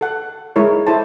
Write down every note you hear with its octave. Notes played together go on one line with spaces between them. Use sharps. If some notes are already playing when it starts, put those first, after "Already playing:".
A4 F#5
G#3 E4 A#4 C#5
E4 A4 C5 A5